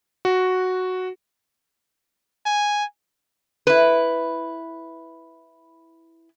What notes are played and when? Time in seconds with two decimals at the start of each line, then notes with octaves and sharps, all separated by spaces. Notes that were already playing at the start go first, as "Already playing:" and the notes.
0.25 F#4
2.46 G#5
3.67 E4 B4